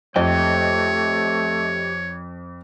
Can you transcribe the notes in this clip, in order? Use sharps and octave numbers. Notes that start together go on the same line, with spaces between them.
F2 A3 G4 C#5 D#5 G5